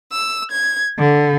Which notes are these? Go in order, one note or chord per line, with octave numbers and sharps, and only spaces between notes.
E6
G#6
D3